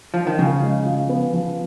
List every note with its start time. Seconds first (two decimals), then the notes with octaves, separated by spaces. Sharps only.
0.14 F3
0.27 D#3
0.39 C#3 F3
0.63 G#3
0.86 F3
1.09 B3
1.34 F3